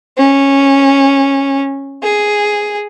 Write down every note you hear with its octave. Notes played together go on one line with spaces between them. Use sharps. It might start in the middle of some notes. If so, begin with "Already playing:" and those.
C#4
G#4